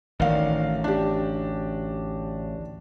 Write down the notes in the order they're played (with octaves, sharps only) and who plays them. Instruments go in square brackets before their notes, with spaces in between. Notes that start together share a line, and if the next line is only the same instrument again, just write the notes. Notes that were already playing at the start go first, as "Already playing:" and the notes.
[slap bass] A1 D2 [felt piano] D#3 D5 F5
[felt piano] D4 G4